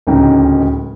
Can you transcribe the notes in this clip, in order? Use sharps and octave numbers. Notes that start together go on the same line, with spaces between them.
D1 C#2 C#4 D#4 G5 A#5